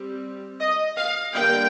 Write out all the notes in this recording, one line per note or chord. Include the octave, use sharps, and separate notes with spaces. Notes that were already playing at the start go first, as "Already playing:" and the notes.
Already playing: G3 C4
D#5
F5
D3 G3 A#3 G5